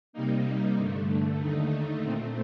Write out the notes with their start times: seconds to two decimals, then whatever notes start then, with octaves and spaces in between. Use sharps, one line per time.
0.13 C3 G3 A#3 D#4
0.76 G2 D3 A3
1.40 D#2 D3 A3 D#4
2.03 A#2 A3 C4